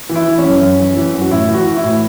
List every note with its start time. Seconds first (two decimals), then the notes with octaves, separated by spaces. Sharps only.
0.09 E3
0.15 E4
0.26 E3
0.38 C#4
0.44 F#2
0.61 F#2
0.79 E3
0.97 E3
1.13 F#2
1.21 F#4
1.31 A2 E4
1.49 E3
1.54 F#4
1.66 E3
1.77 E4
1.84 A2